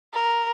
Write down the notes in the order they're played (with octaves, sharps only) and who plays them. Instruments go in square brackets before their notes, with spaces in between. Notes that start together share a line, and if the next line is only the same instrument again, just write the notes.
[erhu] A#4